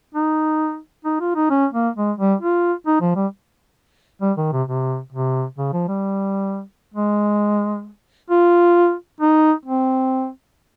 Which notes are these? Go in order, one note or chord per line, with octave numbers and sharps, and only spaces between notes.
D#4
D#4
F4
D#4
C#4
A#3
G#3
G3
F4
D#4
F3
G3
G3
D#3
C3
C3
C3
C#3
F3
G3
G#3
F4
D#4
C4